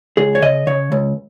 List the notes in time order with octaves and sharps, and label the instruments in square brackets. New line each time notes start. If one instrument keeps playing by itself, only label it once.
[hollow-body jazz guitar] C#2 G#4
C#5
C#3 D#5
C#3 C#5
C#2